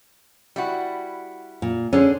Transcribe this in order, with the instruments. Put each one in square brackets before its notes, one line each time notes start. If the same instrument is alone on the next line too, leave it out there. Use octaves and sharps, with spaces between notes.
[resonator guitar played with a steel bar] G3 E4 F#4
[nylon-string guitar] A#2
[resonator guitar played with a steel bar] D3 G#4 C5 [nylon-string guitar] C#4